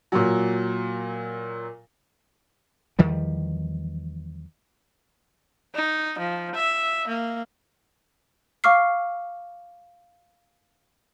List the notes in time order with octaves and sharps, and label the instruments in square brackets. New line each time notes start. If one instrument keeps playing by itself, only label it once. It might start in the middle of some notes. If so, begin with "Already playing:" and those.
[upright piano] A#2 F#3
[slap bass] E2 D#3 F3 G3
[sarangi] D#4
F3
E5
A#3
[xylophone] F5 C#6 D6 F6 C7